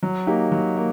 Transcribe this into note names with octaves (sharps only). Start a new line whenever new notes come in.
F#3
A#3 D#4 G4
F#3
A#3